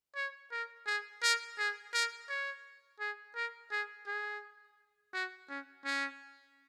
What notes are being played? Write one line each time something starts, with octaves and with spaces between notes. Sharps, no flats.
C#5
A#4
G#4
A#4
G#4
A#4
C#5
G#4
A#4
G#4
G#4
F#4
C#4
C#4